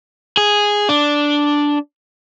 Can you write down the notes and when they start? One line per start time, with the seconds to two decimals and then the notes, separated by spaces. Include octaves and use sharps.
0.37 G#4
0.89 D4